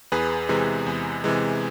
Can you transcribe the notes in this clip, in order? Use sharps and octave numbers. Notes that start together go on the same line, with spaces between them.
E2 G#4 B4
C3 E3 G#3
E2
C3 E3 G#3